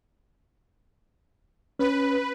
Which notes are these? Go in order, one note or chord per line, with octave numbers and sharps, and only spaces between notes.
C#4 B4